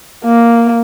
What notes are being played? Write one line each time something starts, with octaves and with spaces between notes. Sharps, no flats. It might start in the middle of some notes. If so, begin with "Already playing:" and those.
A#3